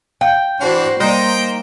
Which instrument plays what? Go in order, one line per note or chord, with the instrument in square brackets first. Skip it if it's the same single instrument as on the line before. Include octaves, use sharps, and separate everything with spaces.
[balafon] F5 [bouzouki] G5
[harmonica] E3 D4 [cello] F#4 C5
[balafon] G3 D5 [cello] A#3 [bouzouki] D#4 [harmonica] C5 G5